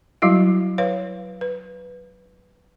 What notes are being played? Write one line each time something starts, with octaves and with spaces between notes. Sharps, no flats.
F#3 G3 E4 F#4 F5
B4 C#5 F5
B4